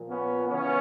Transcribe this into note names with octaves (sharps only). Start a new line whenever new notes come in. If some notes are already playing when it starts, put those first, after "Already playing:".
Already playing: A#2 F3
B3 C#4
C#3 E3 B3 C#4